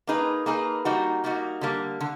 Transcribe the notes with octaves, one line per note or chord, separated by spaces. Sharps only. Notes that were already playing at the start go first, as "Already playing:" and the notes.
A#3 D#4 G#4 B4
A#3 D#4 G#4 B4
G3 A#3 D#4 F#4
G3 A#3 D#4 F#4
D3 G3 A#3
D3